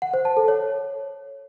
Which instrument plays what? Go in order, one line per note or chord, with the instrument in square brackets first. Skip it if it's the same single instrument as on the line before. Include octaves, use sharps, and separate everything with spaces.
[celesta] F#5
C5
A5
A4
C#5